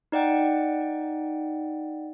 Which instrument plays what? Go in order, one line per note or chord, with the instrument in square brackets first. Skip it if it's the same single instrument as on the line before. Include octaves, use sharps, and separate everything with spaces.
[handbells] D#4 D5 F#5 G5